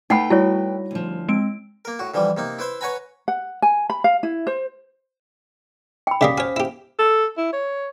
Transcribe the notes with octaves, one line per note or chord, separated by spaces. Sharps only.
A3 D#4 B4 F#5 G5 B5
G3 E4 F#4 C#5
D2 F3
G#3 C4 D7
A#3 A#4
A2 F#4
D3 E3 F3 G3
C3 A#3 D#4
E4 B4 C5 E5
B4 C#5 F#5 G#5 A#5 B5
F#5
G#5
B5
F5
E4
C5
G5 B5
C#3 G3 A#3 C#4 F5 D6 D#6 B6
F#4 C5 C#5 G#5 F6
E4 G4
A4
E4
C#5